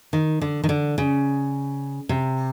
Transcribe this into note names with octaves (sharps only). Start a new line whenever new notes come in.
D#3
D3
D#3
D3
C#3
C3